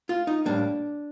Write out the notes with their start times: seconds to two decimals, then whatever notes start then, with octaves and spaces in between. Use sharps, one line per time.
0.09 F4
0.27 D#4
0.45 A2 G3 A#3 D4